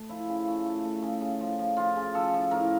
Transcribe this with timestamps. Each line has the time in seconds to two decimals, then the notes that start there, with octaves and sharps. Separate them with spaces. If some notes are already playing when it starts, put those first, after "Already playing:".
Already playing: A3
0.09 F3 E4
0.29 C#3
0.48 A3
0.66 A3
0.85 A3
1.02 C#3
1.21 C#3
1.41 F3
1.59 F3
1.77 F3 F4
1.96 C#3
2.15 F3 A4
2.33 F3
2.51 A2 A#4